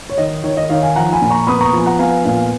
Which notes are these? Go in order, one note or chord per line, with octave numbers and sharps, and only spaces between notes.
C#5
D#3 D#5
D#3 C#5
D#5
D#3 C#5 F5
F5 G#5
F3 F#5 A#5
G#5 B5
A#2
A#5 C#6
B3 B5 D#6
A#5 C#6
F3 G#5
F#5 A#5
B3 F5 G#5
A#2 F5 G#5